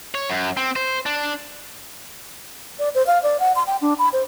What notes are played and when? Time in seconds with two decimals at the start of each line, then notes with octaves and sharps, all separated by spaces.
0.15 C#5
0.30 F#2
0.57 C4
0.76 C5
1.06 D4
2.79 D5
2.95 C5
3.07 F5
3.23 D5
3.40 F#5
3.56 C6
3.67 G5
3.82 D4
3.99 B5
4.13 C5